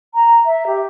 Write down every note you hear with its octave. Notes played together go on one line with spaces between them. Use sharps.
A#5
E5
G4